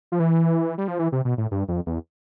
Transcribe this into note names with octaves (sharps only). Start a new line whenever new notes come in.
F3
E3
G3
F3
E3
C3
B2
A2
G2
F2
E2